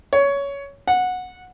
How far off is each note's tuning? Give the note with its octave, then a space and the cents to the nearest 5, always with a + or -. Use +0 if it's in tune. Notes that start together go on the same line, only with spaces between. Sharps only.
C#5 +15
F#5 -15